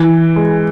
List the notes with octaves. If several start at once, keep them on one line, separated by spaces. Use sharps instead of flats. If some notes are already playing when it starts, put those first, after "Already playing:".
Already playing: E3
G#3